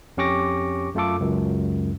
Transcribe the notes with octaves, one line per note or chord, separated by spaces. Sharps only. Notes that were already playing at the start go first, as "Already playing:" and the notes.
F2 C#4 G4 C#6 D6 A#6
F#2 A3 F4 A4 D6
C#2 F#2